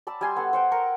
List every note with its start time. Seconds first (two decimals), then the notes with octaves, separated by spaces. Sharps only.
0.07 D5 A5 B5 E6
0.21 G3 G#5 C6
0.36 B3 A4
0.53 C5 F#5 G5
0.72 A#4 A#5 C#6